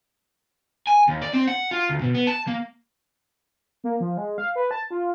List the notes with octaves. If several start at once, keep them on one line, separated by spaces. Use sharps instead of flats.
G#5
D#2
D5
C4
F#5
F4
D2
B2
B3
A5
A#3
A#3
F3
G#3
F5
B4
A5
F4